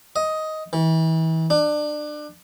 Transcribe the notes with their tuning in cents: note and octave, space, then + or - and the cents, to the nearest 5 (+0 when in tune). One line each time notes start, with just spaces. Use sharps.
D#5 +10
E3 -35
D4 +25